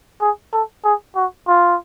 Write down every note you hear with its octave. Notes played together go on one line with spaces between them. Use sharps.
G#4
A4
G#4
F#4
F4